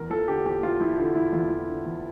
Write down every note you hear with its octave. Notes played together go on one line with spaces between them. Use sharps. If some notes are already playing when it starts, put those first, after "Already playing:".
Already playing: E2 A#4
F3 A4
D3 G4
E2 G4
E2 F4
F3 E4
D3 F4
E2 E4
E2 F4
F3
D3
E2